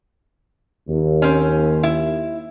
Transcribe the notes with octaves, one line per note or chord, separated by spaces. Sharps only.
D#2
C4 C#4
E4